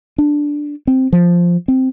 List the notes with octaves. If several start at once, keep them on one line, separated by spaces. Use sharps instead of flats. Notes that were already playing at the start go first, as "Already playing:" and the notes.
D4
C4
F3
C4